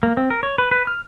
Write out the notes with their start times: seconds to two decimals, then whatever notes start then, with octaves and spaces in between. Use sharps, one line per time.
0.03 A#3
0.17 C4
0.30 A#4
0.43 C#5
0.58 B4
0.71 B4
0.87 F6